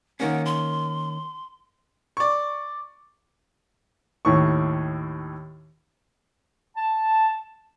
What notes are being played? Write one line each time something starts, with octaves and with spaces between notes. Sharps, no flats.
D#3 A#3 C#4 F#5
C6
D5 C#6
D#2 A2 C#6
A5